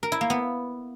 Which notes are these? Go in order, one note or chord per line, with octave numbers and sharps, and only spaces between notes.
A#4
E4
A#3
B3